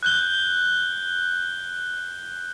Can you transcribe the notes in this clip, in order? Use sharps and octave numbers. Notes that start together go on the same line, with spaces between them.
F#6 G6 G7